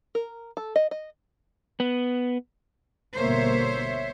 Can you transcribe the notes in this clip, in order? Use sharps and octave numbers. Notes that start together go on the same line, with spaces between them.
A#4
A4
D#5
D#5
B3
G1 B2 A#3 C5 C#5 E5